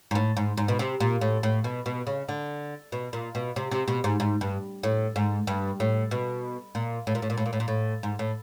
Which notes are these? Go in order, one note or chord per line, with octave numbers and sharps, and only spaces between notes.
G#2
A2
G#2
G#2
B2
C3
A#2
A2
A2
B2
B2
C#3
D3
B2
A#2
B2
C3
C3
B2
G#2
G#2
G2
A2
G#2
G2
A2
B2
A#2
A2
A#2
A2
A#2
A2
A#2
A2
A#2
A2
G#2
A2